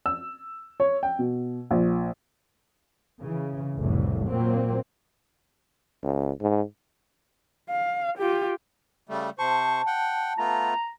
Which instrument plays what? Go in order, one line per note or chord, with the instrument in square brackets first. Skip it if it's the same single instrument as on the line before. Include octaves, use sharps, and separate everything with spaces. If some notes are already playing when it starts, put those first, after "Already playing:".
[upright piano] E6
C#5
G5
B2
A#1
[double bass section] C#3 E3
F1 C2 A2 E3
A#2 F#3 A#3 C4
[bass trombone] C#2
G#2
[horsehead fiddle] F5
F4 G4
[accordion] C#3 G3 A3
[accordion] C3 C5 C#6 [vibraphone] A5
[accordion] F#5 G5
[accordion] A3 B3 F4 [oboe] A#5